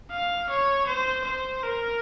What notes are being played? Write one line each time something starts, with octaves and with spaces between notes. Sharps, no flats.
F5
C#5
C5
C5
A#4